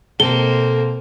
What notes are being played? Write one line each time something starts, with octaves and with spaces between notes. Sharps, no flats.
B2 A#3 C4 A4 G7